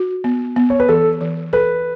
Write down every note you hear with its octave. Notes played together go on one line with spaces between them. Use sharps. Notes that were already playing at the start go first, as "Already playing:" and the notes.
Already playing: F#4
B3
B3
C#5
B4
E3 A4
E3
A4 B4